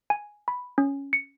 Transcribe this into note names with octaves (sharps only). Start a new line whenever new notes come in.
G#5
B5
C#4
C#7